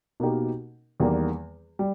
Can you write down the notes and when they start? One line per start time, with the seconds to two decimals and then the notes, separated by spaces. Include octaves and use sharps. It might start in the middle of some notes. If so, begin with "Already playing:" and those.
0.20 B2 A#3 D#4 G4 A#4
1.00 E2 D#3 G3 A#3
1.79 G3